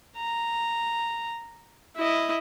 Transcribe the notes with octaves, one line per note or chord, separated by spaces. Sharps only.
A#5
E4 D#5